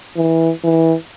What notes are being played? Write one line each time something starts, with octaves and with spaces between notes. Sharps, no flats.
E3
E3